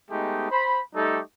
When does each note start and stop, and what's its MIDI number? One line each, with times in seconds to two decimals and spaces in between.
0.11 0.47 56
0.11 0.47 57
0.11 0.47 59
0.11 0.47 63
0.11 0.47 67
0.51 0.81 72
0.51 0.81 83
0.95 1.20 55
0.95 1.20 57
0.95 1.20 63
0.95 1.20 67
0.95 1.20 69